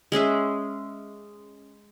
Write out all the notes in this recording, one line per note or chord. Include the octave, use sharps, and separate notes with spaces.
G#3 C#4 G#4 E5